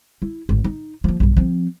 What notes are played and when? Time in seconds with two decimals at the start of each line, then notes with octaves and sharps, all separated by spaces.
0.22 E4
0.49 G#1
0.64 D#4
1.04 F3 A#3
1.20 B1 G2
1.37 F3 C4